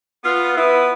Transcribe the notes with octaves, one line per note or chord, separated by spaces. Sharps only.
B3 F4
B3 E4